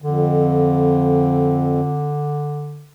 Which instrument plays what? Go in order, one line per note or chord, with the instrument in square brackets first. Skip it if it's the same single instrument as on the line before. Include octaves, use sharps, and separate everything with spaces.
[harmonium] F2 [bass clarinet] D3